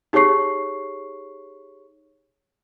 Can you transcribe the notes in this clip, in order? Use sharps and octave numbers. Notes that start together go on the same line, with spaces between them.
D#4 G4 G#4 C#5 C#6 C7